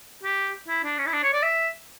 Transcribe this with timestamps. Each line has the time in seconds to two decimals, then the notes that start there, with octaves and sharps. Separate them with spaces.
0.23 G4
0.68 E4
0.84 D4
0.98 C#4
1.06 E4
1.13 D4
1.23 C#5
1.33 D5
1.43 E5